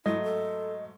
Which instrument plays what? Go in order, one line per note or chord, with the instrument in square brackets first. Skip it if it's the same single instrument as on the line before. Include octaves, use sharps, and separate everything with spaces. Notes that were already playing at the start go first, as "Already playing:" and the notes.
[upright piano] G#2 F#3 A3 [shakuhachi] E4 [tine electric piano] D#5
[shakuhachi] A4